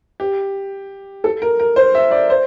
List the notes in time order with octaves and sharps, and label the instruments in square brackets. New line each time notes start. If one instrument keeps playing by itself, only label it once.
[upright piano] G4
A4
A#4
A#4
C5
E5
D5
C5